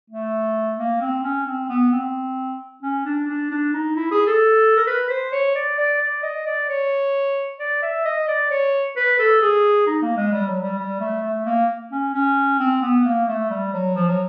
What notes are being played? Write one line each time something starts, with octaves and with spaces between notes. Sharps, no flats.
A3
A#3
C4
C#4
C4
B3
C4
C#4
D4
D4
D4
D#4
E4
G#4
A4
A#4
B4
C5
C#5
D5
D5
D5
D#5
D5
C#5
D5
E5
D#5
D5
C#5
B4
A4
G#4
D#4
A#3
G#3
G3
F#3
G3
G3
A3
A3
A#3
C#4
C#4
C4
B3
A#3
A3
G3
F#3
F3
F#3